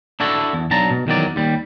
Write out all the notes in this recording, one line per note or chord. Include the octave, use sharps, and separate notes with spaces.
D4 E4 F#4 A4
E2
B1 F#3 D4 A5 A#5
B2
E2 D#3 F#3 D5
D#2 G3